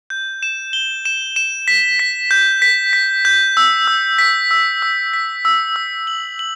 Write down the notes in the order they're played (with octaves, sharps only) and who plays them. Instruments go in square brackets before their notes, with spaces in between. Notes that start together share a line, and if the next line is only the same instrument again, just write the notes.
[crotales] G6
E7
G7
E7
E7
B6
B6
G6
B6
B6
G6
E6
E6
B6
E6
E6
B6
E6
E6
F#7
F#7